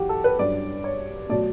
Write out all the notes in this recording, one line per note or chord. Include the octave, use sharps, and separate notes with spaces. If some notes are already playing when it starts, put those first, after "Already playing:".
Already playing: F#2 E3 F#4 G4
A4
B4
G2 F#3 C#4 D5
C#5
B2 F#3 A3 D5